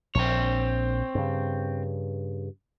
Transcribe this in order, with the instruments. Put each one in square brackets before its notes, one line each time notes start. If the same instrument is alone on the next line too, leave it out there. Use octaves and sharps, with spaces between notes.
[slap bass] A#1 [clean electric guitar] C4 C#5
[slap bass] G2 C#3